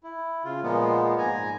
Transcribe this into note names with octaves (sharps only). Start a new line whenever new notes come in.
E4
C#3 F4
A#2 F3 G#3 A#3 B3
G#2 G#5 A#5